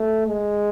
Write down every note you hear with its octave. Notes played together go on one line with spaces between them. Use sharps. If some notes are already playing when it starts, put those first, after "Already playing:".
Already playing: A3
G#3